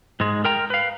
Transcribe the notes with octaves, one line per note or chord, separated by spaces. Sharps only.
G#2 G#3
A#4 G5 A#5
B4 F5